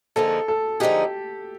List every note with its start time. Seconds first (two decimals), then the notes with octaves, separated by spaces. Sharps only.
0.16 D3 F3 A#3 D#4 G#4 A4
0.48 A4
0.80 D3 F3 A#3 D#4 G4 G#4